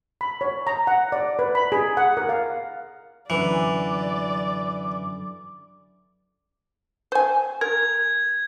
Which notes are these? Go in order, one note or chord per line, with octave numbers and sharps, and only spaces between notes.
B5
C#5
A#5
F#5
D5
B4
B5
G#4
F#5
A#4
F5
F#2 D3 E3 D5 D6
C5 G#5
A#4 G#6